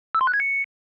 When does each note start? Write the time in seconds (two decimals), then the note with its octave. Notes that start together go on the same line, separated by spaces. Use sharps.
0.15 E6
0.21 C6
0.27 F#6
0.34 G#6
0.40 C#7